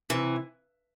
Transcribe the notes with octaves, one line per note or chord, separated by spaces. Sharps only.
C3 E3